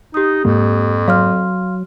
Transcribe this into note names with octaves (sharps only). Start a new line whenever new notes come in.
D#4 G4 D#6
F2 G#2 G#3 A#3
F#3 F5 C6 F6